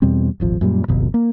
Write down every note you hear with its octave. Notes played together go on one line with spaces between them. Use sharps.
E2 B2 G3 C4
D#1 G#1 F3
F#2 A#2 G3
D1 G1 F2 B2
A#3